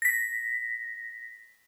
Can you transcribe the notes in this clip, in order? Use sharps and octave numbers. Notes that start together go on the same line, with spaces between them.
A#6 B6